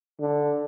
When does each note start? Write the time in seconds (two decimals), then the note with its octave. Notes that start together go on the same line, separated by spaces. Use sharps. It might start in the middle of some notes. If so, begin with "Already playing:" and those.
0.20 D3